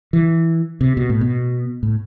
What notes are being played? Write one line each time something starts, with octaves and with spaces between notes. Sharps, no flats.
E3
C3
B2
A2
B2
A2